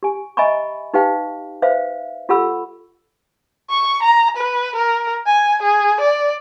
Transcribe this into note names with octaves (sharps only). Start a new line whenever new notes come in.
G4 G#5
D#5 E5 G#5 A#5 B5 C#6
D#4 G4 B4 F5 G5
B4 C5 E5 F5
F4 G4 A4 F#5 B5 E6
C#6
A#5
B4
A#4
G#5
G#4
D5